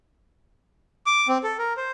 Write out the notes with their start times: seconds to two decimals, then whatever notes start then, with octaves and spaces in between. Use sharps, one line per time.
1.06 D6
1.28 C4
1.44 A4
1.58 A#4
1.77 C5